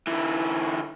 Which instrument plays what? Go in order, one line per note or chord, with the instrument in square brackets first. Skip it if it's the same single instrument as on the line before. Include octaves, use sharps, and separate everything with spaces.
[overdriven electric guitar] D3 E3